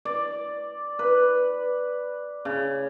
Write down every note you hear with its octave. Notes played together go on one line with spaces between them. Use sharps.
D5
B4
C#3